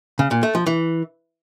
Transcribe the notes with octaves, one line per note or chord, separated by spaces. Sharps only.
C#3
A#2
A3
F3
E3